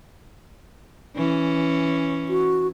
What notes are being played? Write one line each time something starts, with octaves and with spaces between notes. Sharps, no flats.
E3 C#4
F#4